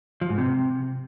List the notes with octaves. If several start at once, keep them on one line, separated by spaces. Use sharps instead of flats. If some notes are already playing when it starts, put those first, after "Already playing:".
F3
G#2
C3